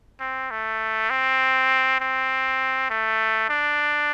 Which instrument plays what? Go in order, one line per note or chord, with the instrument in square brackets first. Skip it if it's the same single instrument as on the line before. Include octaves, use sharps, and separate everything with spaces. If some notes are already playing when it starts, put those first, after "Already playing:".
[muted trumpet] C4
A3
C4
C4
A3
D4